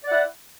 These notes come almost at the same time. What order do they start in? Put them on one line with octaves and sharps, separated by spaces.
D5 F#5 E4